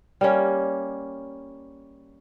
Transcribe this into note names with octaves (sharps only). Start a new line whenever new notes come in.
G3 A#3 C#4